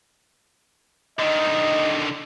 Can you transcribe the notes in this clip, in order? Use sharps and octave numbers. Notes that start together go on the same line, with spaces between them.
D3 D#3 D#5